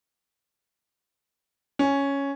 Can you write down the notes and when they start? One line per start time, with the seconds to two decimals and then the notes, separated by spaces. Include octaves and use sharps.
1.79 C#4